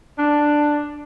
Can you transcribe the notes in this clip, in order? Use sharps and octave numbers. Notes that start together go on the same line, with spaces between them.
D4